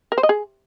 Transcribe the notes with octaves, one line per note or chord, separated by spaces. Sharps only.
A#4
C5
D#5
G#4